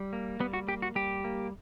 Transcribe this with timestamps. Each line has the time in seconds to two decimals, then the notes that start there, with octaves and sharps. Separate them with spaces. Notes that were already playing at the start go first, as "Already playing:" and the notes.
Already playing: G3
0.13 A#3
0.40 G3 B3
0.53 F#4
0.67 A#3 G4
0.82 F#4
0.95 G3 G4
1.24 A#3